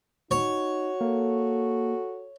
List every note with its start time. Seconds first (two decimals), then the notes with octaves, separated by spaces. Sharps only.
0.31 D#4 F#4 C#5
1.01 A#3 A4